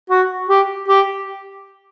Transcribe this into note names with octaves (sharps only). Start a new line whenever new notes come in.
F#4
G4
G4